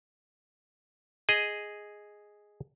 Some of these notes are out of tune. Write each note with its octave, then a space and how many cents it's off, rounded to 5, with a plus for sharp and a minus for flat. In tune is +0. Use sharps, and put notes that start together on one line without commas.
G#4 +0 D#5 +0